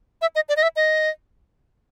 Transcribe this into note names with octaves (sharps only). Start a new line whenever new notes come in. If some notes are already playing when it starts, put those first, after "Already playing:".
E5
D#5
D5
D#5
E5
D#5